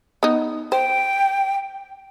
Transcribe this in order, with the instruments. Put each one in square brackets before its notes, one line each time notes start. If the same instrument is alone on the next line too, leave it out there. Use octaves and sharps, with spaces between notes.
[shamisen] B3 D#4
[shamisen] C5 [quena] G5